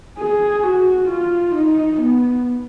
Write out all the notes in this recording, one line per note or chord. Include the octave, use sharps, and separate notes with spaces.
G#4
F#4
F4
D#4
B3